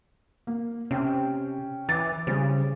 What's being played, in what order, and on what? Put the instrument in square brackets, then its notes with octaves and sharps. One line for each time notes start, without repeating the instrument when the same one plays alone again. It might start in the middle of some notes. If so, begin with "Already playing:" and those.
[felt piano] A#3
[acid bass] C3 [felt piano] C#4 G5
[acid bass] E3 [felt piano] D6 A6
[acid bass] C#3 [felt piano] G3 C5